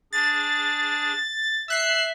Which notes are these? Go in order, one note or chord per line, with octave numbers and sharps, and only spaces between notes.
D4 G#4 A6
E5 E6 F#6 C7